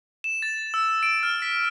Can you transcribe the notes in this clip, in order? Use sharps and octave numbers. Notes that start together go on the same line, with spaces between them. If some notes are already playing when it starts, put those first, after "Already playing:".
E7
A6
E6
D7
F6
B6